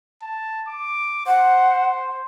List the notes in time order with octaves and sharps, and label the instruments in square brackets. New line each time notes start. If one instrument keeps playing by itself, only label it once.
[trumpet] A5
D6
[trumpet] C5 [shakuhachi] F#5